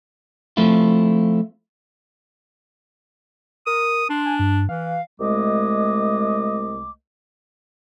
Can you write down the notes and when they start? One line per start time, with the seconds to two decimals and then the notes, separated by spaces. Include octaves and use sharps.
0.57 F3 A3 C4 E4 F4
3.67 A#4 D#6
4.10 D4 C6
4.26 G#5
4.39 G2
4.69 E3 F5
5.21 C2 G#3 A3 D#5 D6